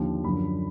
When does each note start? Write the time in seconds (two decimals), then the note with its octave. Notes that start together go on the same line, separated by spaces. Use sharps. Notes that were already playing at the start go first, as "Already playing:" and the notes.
Already playing: D#2 D3 F3
0.24 F#2 D3 F3 B5